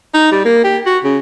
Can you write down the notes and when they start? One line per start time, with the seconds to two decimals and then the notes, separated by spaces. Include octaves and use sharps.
0.14 D#4
0.32 G3
0.45 A#3
0.64 G4
0.86 F#4
1.04 C#3